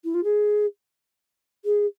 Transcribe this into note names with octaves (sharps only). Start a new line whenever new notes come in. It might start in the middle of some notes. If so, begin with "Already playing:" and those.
E4
F4
G#4
G#4